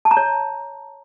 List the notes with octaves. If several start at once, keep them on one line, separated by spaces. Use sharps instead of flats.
A5
A#5
C#5